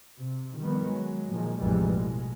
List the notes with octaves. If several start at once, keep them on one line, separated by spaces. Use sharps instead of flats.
C3
D#3 F3 G3 B3
F#3 G#3
A#2 D#3 F3 G#3
A1 F2 C3 E3 G3 G#3
B2 G#3